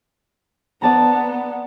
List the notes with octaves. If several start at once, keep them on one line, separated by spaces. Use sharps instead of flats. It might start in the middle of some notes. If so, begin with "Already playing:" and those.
B3 D5 A5 A#5